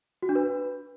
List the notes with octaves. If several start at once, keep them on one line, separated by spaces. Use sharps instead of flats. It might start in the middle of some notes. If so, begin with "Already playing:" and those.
F#4
D4
B4